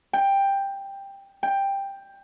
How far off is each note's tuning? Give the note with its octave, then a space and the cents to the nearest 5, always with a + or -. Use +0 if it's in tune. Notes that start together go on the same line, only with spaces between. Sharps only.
G5 +10
G5 +10